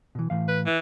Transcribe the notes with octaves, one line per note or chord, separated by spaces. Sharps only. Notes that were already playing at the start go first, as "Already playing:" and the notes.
B2 E3
A2 E3 F5
B4
E3